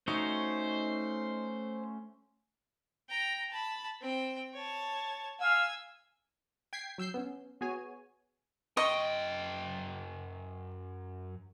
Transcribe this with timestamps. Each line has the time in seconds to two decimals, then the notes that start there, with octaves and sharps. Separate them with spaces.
0.08 A3 C#4 D#4 F#4 C5
3.09 G5 A#5
3.51 A5 B5
4.01 C4 G5
4.53 C#5 A5
5.40 F5 G#5 E6
6.73 G5 G#6 B6 C7
6.98 F#3 E6 G6 C7
7.14 B3 C#4
7.61 B3 F#4 G#4 C#5 G#5
8.77 F#2 D#5 G5 C6 C#6